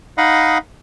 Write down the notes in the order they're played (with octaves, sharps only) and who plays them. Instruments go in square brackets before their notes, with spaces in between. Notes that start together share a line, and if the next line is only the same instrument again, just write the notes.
[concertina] D#4 D#5 F5 F#5 B5